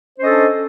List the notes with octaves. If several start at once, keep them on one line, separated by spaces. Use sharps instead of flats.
C#4 D4 A4 C5 D#5